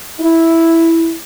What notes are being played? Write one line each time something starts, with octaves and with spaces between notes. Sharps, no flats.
E4